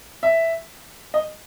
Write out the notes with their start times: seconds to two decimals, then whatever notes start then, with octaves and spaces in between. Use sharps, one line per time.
0.23 E5
1.14 D#5